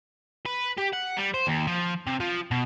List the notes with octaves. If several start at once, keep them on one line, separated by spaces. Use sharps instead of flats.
B4
G4
F#5
G3
C5
D#2
F3
C3
F3
B2